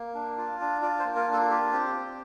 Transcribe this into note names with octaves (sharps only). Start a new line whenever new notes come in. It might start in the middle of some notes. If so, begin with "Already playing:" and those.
Already playing: A#3
D4
F4
D4
F4 D5
C5
A#3
A#4
D4
A4
F4 G4
C4 G4
C4